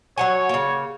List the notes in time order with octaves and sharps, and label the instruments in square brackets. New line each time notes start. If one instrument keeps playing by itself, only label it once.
[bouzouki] F#3 F#5 G#5 [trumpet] C#5
[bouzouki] C#3 A#3